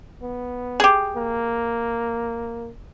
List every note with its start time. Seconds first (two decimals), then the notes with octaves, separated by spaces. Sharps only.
0.22 B3
0.80 G4 G#4
1.16 A#3